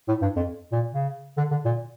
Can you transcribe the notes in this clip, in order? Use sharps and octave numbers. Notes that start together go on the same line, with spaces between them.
A2
G2
F2
A#2
C#3
D3
D3
A#2